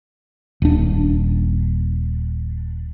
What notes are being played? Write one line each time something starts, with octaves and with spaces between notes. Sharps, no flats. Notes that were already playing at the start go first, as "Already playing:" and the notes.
D#1 D4